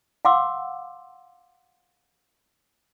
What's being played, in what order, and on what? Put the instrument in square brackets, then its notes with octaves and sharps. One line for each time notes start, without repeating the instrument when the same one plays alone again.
[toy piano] F5 F#5 C6 D6 E6